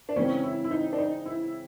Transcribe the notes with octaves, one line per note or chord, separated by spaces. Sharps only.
D4
C#3 E3 G#3 C4 C#4
E4
E4
D#4
D4
D#4
E4